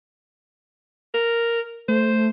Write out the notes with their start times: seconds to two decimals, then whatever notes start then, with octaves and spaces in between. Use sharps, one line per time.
1.14 A#4
1.89 A3 C5